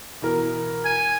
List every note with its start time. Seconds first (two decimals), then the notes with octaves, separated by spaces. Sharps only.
0.22 B2 E3 A#4
0.85 G#5